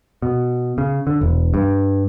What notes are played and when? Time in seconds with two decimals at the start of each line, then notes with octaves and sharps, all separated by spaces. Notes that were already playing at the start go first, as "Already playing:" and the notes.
0.22 B2
0.78 C#3
1.07 D3
1.21 E1
1.54 G2